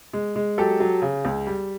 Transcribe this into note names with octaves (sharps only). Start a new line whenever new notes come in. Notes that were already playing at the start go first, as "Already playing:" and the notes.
G#3
G#3
F#3 G4 A4
F#3
C#3
C#2
G3